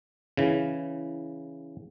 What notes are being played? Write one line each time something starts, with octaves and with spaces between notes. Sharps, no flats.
C#3 E3